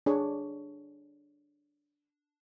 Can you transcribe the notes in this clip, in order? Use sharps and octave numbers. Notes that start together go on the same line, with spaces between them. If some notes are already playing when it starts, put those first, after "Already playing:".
D4 G#4 C#5